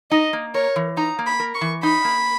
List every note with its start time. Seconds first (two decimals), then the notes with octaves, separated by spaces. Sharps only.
0.11 D#4 D#5
0.33 A#3
0.54 A#4 C#5
0.76 E3
0.97 D#4 A#5
1.19 A#3
1.26 B5
1.40 A#4
1.55 C#6
1.61 E3
1.83 D#4 B5
2.05 A#3